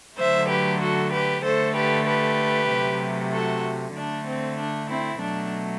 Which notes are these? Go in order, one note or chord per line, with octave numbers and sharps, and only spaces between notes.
D3 F#3 A3 C5 E5
G4 B4
F#4 A4
G4 B4
D3 A3 A4 C5
G4 B4
G4 B4
C3 F#3 A3
F#4 A4
D3 A3 D4
C4
D4
C4 E4
B2 F#3 A3 D4